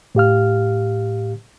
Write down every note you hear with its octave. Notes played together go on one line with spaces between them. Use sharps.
A2 G4 F5 F6